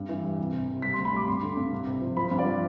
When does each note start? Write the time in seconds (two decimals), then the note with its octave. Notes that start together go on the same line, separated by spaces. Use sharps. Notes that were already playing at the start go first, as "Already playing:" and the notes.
Already playing: G2
0.09 E3
0.24 G3
0.38 C2
0.53 C3
0.68 C3
0.82 G3 B6
0.94 C6
0.98 D2
1.05 B5
1.13 G3 D6
1.28 G2 C6
1.43 D3
1.57 G2
1.72 C2
1.87 C3
2.02 F3
2.17 F3 B5
2.31 G2
2.39 D5
2.46 F3